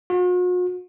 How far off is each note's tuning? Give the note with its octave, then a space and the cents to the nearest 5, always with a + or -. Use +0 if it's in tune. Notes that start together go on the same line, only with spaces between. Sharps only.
F#4 -45